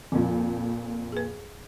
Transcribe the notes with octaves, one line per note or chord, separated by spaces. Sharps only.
F2 A#2 F3
G#4 B4